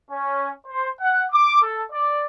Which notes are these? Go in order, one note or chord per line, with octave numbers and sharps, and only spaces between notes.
C#4
C5
F#5
D6
A4
D5